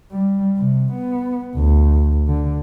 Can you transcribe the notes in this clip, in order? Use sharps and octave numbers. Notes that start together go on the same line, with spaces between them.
G3
C3
B3
D2
D3